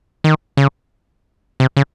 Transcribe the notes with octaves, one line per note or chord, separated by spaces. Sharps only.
D#3
C#3
C3
C#3